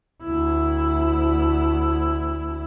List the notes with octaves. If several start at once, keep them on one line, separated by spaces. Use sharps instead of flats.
D2 E4